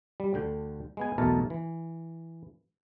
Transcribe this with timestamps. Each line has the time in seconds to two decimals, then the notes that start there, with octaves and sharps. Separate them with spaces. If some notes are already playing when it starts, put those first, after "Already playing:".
0.20 G3
0.34 D2 D3 G5
0.97 G#3 B3 G#5
1.18 B1 E2 B2 A3 A#4 A5
1.50 E3